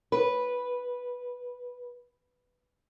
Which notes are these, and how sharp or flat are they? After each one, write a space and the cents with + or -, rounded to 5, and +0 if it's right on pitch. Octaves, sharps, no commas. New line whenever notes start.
B4 -5